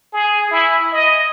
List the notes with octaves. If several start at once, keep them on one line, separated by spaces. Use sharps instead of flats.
G#4
E4
D#5